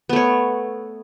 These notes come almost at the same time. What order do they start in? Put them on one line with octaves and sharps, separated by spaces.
B3 A3 C#5